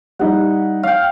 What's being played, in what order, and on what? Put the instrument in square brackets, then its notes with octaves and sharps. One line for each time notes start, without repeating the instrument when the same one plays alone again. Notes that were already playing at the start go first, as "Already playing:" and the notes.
[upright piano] G3 D#4 E4 [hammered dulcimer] F#5
[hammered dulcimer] F5 G5